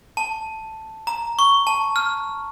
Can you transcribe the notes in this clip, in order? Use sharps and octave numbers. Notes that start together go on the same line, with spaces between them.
A5
A#5
C#6
A5
F6